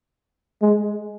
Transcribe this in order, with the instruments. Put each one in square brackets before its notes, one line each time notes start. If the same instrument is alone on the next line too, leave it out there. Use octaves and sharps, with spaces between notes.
[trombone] G#3